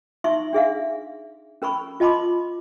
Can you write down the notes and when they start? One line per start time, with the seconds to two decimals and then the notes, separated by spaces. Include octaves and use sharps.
0.24 D#4 E5 C6 C#6
0.53 D4 G#4 E5 F5
1.62 C#4 A#4 B5 C#6
2.00 F4 D#5 A5 B5 C6 D6